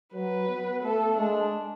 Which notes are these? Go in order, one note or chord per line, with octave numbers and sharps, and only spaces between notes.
F#3 B4
B3
A3 A4
G#3 D4